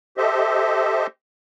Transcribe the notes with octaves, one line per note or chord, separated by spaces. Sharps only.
G4 A4 C5 D#5 E5